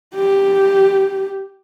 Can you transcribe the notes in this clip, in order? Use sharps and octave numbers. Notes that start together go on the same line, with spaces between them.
G4